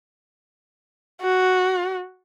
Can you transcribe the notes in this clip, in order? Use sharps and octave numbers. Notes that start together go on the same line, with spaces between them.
F#4